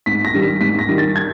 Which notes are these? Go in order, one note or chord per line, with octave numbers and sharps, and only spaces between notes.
G#2 B6
A#6
D#3 G3
B6
G#2 B6
A#6
D#3 G3
A6
G#6